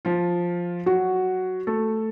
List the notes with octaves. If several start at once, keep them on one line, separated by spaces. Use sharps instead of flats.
F3 F4
F#3 F#4
A3 A4